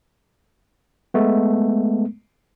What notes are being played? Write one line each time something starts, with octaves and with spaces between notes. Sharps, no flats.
G#3 A3 B3